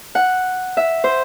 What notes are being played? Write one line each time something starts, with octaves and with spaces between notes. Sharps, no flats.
F#5
E5
C5